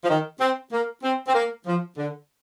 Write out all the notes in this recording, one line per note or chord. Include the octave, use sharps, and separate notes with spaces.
F3
D#3
C4
A#3
C4
C4
A#3
F3
D3